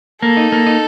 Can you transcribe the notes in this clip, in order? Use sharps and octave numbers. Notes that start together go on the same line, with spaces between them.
A#3 A4
D#4
A#3
D#4